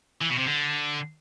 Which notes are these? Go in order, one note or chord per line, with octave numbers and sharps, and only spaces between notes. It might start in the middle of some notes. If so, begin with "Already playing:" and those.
E3
B2
C3
D3